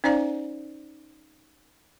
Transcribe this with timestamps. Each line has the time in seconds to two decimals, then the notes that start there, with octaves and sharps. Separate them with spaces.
0.04 C#4 D#4 C5 D5 F5 A#5